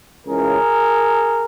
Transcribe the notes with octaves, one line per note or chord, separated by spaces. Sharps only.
C#2 C#3 E3 G#4 A#4